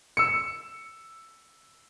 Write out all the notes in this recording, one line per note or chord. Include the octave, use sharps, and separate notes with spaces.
E6 C#7